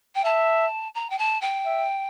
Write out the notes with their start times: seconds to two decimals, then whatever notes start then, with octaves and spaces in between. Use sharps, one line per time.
0.15 G5
0.24 E5 A5
0.95 A#5
1.10 G5
1.18 A5
1.41 G5
1.65 E5